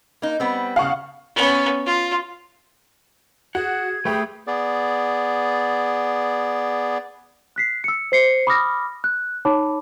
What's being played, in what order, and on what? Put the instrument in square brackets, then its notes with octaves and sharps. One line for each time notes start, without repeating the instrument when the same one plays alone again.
[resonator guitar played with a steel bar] A#3 D#4
G3 B3 C4
[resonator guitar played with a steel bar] C#3 G3 [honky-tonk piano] F5 F#5 C#6
[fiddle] B3 C#4
F4
[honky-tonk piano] F#4 [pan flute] G#4 [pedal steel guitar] F#5 [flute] G#6
[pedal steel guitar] A3 G4 [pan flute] G#4 [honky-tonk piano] B4 G5
[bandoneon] B3 G#4 D5
[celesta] F#6 B6 C7
E6 C#7
C5 C7 C#7
B5 D6 D#6 F6 A#6
F#6
D#4 C#5 A5 B5 D6